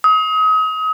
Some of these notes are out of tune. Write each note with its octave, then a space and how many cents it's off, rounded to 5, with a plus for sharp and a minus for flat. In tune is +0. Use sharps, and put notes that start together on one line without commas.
D#6 +35